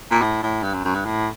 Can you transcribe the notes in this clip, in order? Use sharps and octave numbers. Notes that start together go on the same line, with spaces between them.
A#2
A2
A2
G2
F#2
F#2
G2
A2